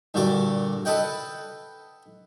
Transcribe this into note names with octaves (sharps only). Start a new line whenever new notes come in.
G2 A#2 D3 F#4 D5
A4 B4 D#5 F#5 G5